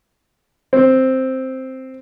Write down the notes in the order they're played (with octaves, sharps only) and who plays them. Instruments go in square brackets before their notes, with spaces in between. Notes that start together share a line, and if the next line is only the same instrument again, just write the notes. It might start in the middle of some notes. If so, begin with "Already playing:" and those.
[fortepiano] C4